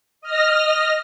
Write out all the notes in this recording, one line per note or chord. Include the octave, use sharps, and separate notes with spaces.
D#5 F6 A#6